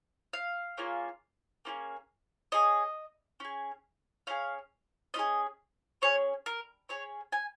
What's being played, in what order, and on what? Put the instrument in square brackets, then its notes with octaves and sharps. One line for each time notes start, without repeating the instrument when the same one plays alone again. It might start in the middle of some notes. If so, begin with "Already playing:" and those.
[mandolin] F5
A#3 C#4 F4 G#4
A#3 C#4 F4 G#4
C#4 G#4 D#5
C#4 G#4
C#4 F4 G#4 F5
C#4 F4 D#5
G#4
C#4 G#4 C#5
A#4
C#4 G#4 C#5
G#5